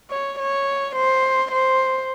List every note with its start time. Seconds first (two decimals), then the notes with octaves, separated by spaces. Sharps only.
0.10 C#5
0.39 C#5
0.96 C5
1.52 C5